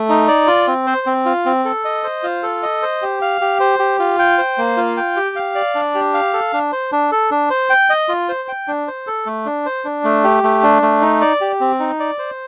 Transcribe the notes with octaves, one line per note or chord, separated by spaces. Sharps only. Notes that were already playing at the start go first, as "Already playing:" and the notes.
Already playing: A3
D#4
D5
F4
C4
C5
C4
F4
C4
A4
D#5
C5
F4
A4
D#5
C5
G4
F5
G4
C5
G4
F4
G5
C5
A#3
F4
G5
G4
F5
D5
D4
G4
F5
A4
D4
C5
D4
A4
D4
C5
G5
D#5
F4
C5
G5
D4
C5
A4
A3
D4
C5
D4
A3
G4
A3
D4
A3
D#4
D5
G4
C4
D#4
D5
C5